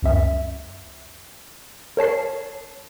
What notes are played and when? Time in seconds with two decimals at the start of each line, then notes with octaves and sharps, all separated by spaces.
0.02 C#2 F#2 E5
1.97 A#4 C#5 A5 C7